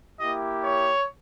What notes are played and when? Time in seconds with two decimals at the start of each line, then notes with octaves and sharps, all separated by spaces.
0.19 A#3 E4 G4 D#5
0.64 C#5